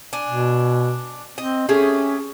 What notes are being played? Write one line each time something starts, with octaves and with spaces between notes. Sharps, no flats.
D4 G#5
B2
C4 D#5
A3 C#4 G4 G#4